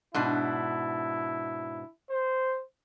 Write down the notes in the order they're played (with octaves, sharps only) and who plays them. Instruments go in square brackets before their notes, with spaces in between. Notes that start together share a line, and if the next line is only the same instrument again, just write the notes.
[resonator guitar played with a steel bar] G#2 B2 D4 [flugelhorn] E4
[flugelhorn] C5